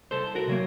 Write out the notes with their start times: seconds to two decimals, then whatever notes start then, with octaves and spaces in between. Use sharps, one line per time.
0.11 C2 A4 C5
0.35 F#4 A#4
0.47 C3 F#3 A#3